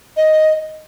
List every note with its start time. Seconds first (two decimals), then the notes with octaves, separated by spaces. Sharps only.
0.17 D#5